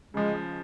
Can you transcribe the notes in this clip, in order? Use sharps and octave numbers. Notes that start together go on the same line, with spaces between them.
C#3 F3 G#3